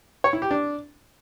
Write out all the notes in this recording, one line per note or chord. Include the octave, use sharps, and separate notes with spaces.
C#5
E4
G4
D4